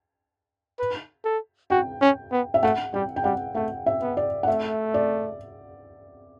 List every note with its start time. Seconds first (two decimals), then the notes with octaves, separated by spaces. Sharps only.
0.79 B4
1.25 A4
1.70 F#4 G5
2.02 C#4
2.32 B3
2.54 E5
2.63 A3 F#5
2.94 G3 G5
3.16 G5
3.24 G3 F#5
3.55 A3 F#5
3.86 E5
4.01 B3
4.17 D5
4.43 F#5
4.47 A3 E5
4.94 D5